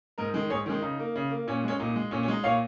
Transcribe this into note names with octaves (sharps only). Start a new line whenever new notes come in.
G#2 A#4 D#5
D#3 G#3
G#2 G#4 C#5
D#3 G#3 C#4
C#3 D#4
A#3
C#3
A#3
A#2 C#4
G#3 C#4
A#2 D#4
G#3
A#2 C#4
C#4
G#3 D#4
A#2 C#5 F5